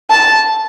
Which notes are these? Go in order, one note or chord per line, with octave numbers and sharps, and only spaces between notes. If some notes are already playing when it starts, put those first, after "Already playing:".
A5